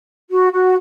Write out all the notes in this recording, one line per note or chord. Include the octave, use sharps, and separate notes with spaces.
F#4
F#4